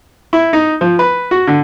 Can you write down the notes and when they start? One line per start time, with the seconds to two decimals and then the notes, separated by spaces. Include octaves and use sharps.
0.33 E4
0.53 D#4
0.81 F3
0.99 B4
1.31 F#4
1.47 D3